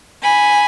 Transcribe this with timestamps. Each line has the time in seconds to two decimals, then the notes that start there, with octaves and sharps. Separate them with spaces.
0.23 G#5 B5